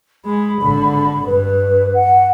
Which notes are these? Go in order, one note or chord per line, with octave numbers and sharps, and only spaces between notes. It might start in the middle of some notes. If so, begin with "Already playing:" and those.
G#3 B5
G#1 D3
G2 B4
F#5